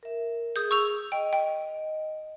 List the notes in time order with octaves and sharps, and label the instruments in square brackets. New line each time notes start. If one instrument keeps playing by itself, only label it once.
[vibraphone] A#4 E5
[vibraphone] G#4 [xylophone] D#6 G6
[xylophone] C#6 E6 F7
[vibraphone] D#5 [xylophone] G5
[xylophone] G5